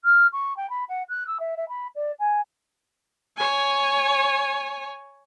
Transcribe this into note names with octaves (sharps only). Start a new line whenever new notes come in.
F6
C#6
G5
B5
F#5
F#6
E6
E5
E5
B5
D5
G#5
C#5 G#5